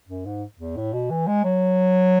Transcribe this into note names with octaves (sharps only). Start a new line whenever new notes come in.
F#2
G#2
E2
A2
B2
E3
G#3
F#3